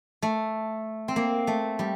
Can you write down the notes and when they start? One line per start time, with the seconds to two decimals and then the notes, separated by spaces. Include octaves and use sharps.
0.22 A3
1.08 C4
1.16 A#3
1.47 A3
1.79 G3